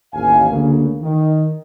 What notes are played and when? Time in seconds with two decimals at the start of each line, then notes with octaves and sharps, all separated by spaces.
0.14 A1 D#2 F5 G#5
0.50 D2 C#3 A#3
1.02 D#3